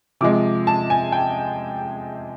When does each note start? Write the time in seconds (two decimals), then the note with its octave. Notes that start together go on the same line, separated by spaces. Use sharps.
0.21 C3 F3 G#3 D6
0.67 A5
0.90 G#5
1.12 G5